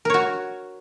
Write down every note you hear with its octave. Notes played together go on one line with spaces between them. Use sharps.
F#4 A#4 C#5